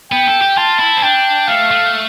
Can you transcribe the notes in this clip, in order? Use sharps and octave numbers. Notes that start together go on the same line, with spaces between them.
B3 G5
A4
G4
F4 A5
E4
C4
D4 G5
A3 F5
A3